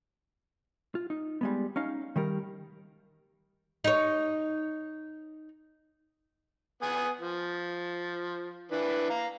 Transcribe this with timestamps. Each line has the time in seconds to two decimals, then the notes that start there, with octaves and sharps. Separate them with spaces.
0.95 F4
1.10 D#4
1.41 G3 G#3 B3
1.76 C#4 D#4 F5
2.16 D#3 G3 A#4
3.84 D#4 C#5
6.83 B3 G#5 D#6
7.20 F3
8.71 E3 D4 B4
9.10 F5 A#5